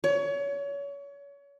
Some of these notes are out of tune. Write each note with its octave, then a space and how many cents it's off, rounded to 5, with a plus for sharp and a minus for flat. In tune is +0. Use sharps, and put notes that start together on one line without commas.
C#5 +30